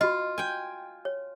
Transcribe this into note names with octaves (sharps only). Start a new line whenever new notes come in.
F4 F#4 D#5
G5 G#5
C#5